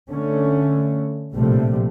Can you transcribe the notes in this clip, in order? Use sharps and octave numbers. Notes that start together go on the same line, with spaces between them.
D3 A3 C#4
A#1 A2 C3 F3 G3 A3